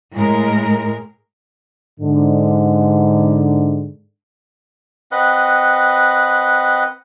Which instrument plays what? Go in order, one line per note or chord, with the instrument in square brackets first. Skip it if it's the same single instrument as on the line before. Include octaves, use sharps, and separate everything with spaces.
[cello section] A2 G#3 A#4
[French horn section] G#2 D3
[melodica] C4 B4 D#5 F#5